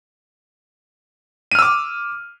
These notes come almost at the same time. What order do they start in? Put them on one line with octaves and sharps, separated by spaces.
D#7 F6 E6 D6